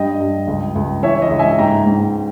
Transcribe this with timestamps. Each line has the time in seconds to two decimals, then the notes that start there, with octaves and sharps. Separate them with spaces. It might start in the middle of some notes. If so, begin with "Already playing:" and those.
Already playing: G2 D#5 G5
0.20 G2
0.47 C#2
0.75 C#2
1.03 E3 C#5 E5
1.22 D#5
1.30 C#2
1.39 E5 G#5
1.58 G#2 G5 A#5
1.86 G#2